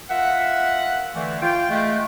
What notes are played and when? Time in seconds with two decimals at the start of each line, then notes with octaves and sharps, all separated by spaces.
0.10 F4 A#4 E5 F#5
1.15 D3 E3 A3
1.42 F4 G5
1.70 G#3 A3